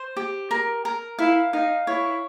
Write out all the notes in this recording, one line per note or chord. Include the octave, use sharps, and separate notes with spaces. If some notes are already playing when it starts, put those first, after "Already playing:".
Already playing: C5
G4
A#4
A#4
E4 F5
D#4 F5
E4 C#5